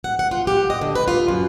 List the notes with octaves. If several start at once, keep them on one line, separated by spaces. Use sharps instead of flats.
F#5
F#5
F4
G4
D#5
D3
B4
F4
F#2